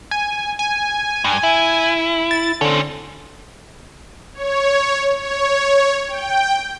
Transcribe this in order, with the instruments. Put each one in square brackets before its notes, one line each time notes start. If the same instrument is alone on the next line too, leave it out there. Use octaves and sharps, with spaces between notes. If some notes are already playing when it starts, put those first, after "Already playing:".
[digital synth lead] G#5
G#5
[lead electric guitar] G2
E4
[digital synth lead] A6
[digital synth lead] D3 [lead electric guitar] C4 C#4
[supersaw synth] C#5
C#5
G5